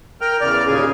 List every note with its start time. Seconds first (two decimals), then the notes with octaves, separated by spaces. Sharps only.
0.21 A#4 G5 F6
0.41 E2 C#3 D5 F6
0.67 D#2 A#2 C#3 G#4